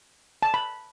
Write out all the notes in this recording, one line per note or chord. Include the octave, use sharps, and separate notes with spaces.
A5
B5